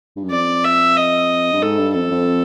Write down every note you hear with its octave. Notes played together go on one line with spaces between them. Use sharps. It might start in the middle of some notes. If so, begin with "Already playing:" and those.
G2
F#2
F2 D5
E5
D#5
G2
G#2 A4
G2
F2 A4
F2